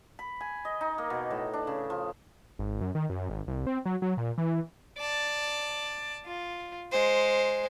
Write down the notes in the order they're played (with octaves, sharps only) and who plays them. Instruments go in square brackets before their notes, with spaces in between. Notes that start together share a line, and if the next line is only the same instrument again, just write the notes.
[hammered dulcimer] B5
G#5
D#5
D#4
A#3
B2
A2
D4
C#3
F3
[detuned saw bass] G#1
F#2
D#3
F#2
G#1
C2
C4
F#3
F#3
A#2
E3
[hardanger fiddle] D5 A5
F4
G#3 C5